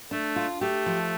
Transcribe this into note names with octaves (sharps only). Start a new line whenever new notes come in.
A3 D4
F4
A3 G4
F3